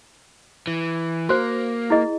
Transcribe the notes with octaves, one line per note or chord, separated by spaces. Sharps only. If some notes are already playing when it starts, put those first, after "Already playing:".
E3
A#3 F#4 C5
E4 G#4 D#5